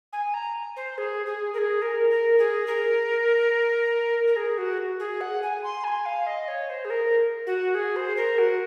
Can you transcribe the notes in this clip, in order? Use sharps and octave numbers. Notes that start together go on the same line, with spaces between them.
G#5
A#5
C5
G#4
G#4
A#4
G#4
A#4
A#4
G#4
A#4
A#4
G#4
F#4
G#4
F#5
G#5
C6
G#5
F5
D#5
C#5
C5
G#4
A#4
F#4
G#4
C5
A#4
F#4